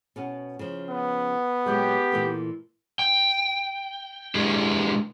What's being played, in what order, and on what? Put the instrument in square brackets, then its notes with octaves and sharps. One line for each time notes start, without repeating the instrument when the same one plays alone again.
[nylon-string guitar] B2 B3 C#4
C#3 F3
[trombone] B3
[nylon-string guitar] A#2 F#3 G#3 [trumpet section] G4
[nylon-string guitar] A#2 E3 A3
[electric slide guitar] G5
G#3 D4 E4 G4 G#4